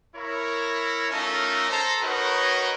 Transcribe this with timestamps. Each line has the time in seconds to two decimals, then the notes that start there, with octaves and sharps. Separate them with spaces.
0.15 E4 A#4 C#5
1.11 A3 C#4 D#4 F4 A4 A#4
1.70 A4 C5 A#5
2.02 D#4 F#4 A#4 B4 C#5 D#5